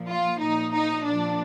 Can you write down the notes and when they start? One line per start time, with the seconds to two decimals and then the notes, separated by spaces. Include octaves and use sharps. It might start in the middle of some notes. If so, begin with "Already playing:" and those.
Already playing: A#2 F3
0.09 F4
0.41 A#2 F3 D#4
0.74 D#4
1.05 A#2 F3 D4